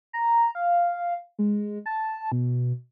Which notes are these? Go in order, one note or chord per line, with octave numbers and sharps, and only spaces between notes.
A#5
F5
G#3
A5
B2